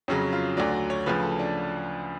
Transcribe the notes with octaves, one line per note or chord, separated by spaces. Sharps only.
F2 C#3 F#3 C#4
F4
D2 D3 F#3 D5
D5
C#5
D2 C#3 F3 B4
A4
D4